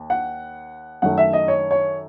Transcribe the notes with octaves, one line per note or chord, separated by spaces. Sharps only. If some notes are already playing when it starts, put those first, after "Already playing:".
Already playing: D#2
F#5
F#2 D#3 A3 F#5
E5
D#5
C#5
C#5